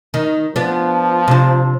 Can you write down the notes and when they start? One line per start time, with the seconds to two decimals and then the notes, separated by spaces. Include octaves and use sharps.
0.14 D#3
0.56 F3 B3 D4
1.28 C3 D4